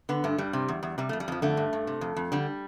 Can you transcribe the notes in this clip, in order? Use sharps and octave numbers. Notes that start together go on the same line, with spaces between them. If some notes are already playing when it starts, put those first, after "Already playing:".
D3 B3
G2 A3
G2 G3
C3
E2
E2
C3 G3
F2 A3
G3
F2 F3
D3 A3
G2
G2
C3
F2
F2
D3 G3